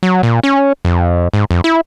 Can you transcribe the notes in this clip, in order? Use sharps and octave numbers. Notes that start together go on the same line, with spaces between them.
F#3
A#2
C#4
F2
G#2
F2
E4